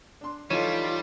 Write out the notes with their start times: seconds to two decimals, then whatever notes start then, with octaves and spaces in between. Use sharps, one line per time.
0.21 D4 C6
0.50 E3 G3 D#4 F4 A4 C#5 D#7 E7